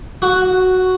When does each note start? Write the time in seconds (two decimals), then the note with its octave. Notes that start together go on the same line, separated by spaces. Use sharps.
0.22 F#4